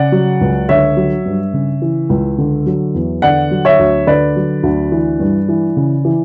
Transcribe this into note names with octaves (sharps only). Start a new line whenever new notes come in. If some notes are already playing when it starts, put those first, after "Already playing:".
Already playing: C#3 D5 F#5
F#3
C#2
D3 C#5 E5
F#3
G2
C#3
E3
C#2
D3
F#3
E2
D3 D5 F#5
F#3
C#5 E5
D2
D3 B4 D5
F#3
D2
E3
G2
E3
C#3
E3